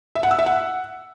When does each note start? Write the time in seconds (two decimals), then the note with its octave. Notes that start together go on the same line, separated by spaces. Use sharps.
0.15 E5
0.23 F#5
0.31 E6
0.39 E5
0.46 F#5